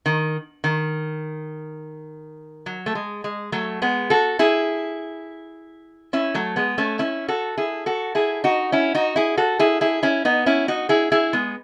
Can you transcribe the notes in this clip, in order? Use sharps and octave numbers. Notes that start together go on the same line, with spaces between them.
D#3
D#3
F#3
A3
G#3
G#3
F#3 A3
G#3 B3
F#4 A4
E4 G#4
C#4 E4
F#3 A3
G#3 B3
A3 C#4
C#4 E4
F#4 A4
E4 G#4
F#4 A4
E4 G#4
D#4 F#4
C#4 E4
D#4 F#4
E4 G#4
F#4 A4
E4 G#4
E4 G#4
C#4 E4
B3 D#4
C#4 E4
D#4 F#4
E4 G#4
E4 G#4
G#3 B3